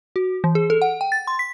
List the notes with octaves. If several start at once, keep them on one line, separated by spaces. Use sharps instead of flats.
F#4
E3
G#4
A4
F#5
G5
A6
C6
B6